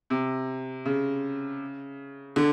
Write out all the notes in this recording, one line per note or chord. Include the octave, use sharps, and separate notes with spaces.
C3
C#3
D3